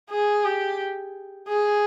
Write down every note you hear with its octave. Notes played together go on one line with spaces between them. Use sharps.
G#4
G4
G#4